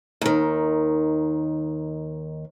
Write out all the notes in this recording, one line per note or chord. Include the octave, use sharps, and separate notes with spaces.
D#2 D#3